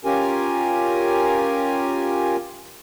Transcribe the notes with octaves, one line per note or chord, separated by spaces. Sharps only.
C#4 F4 G4 A#4 G#5